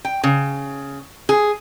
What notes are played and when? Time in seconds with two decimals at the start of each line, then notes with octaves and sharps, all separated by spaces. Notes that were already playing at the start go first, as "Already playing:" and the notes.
0.05 G5
0.24 C#3
1.29 G#4